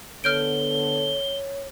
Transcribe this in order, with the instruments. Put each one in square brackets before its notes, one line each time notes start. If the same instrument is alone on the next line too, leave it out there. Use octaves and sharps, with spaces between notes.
[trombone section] D3 B3 A4 [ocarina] C#5 [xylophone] F6 G6 D7 [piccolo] G7